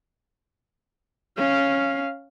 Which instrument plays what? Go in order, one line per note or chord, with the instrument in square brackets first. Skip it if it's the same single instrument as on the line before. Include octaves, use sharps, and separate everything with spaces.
[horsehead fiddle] C#4 F5